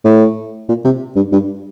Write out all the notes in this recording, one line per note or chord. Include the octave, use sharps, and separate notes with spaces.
A2
A#2
C3
G2
G2